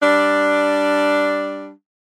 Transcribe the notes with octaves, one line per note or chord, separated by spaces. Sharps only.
G3 D4